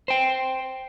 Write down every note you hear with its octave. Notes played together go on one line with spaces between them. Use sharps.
C5 G5